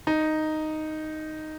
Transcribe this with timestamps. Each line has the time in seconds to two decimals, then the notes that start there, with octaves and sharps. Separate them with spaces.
0.07 D#4